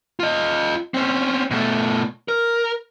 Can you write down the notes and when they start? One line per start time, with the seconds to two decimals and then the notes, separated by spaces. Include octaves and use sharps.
0.20 F4 D#5
0.94 C4 C#4
1.51 B2 A3
2.28 A#4